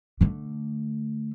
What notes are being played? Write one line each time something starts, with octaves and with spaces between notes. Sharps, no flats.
D3 A3